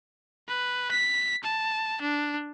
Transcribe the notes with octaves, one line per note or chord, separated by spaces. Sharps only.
B4
B6
A5
D4